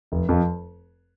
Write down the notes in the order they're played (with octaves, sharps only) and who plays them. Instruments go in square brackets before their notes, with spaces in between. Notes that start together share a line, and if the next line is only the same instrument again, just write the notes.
[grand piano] F1
F2 F3